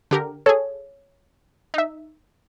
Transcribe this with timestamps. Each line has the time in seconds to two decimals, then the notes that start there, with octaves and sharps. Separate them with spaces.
0.11 D3 G4 A#4
0.46 G#4 A4 C#5
1.74 D#4 E5